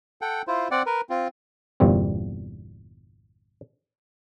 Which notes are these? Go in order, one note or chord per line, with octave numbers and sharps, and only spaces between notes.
A4 F#5 G5
E4 F4 C5
C4 D5 F#5
A#4 B4
C4 F4
G1 E2 A#2 G3 C4